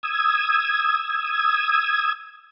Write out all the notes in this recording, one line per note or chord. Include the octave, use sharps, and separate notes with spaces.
D#6 E6 G#6